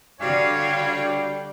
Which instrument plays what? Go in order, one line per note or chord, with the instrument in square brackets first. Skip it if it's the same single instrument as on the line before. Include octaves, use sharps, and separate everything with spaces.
[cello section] D3 F#4 F5 [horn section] G3 D4 G5 [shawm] C#5